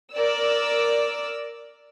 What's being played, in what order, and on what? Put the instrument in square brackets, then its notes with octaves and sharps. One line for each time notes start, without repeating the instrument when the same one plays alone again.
[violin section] A#4 D5 E6